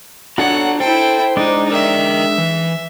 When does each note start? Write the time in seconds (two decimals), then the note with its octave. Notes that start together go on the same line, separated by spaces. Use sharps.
0.38 D4 F#4 A4 C#5 D5 F#5 A#5
0.80 E4 A4 C5 G5
1.37 G#3 D4 D#4 D5
1.72 A#4 D#5 E5 G5
2.38 E3